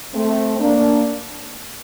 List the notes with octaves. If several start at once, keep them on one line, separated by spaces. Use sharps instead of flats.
A3 C4
A#3 D4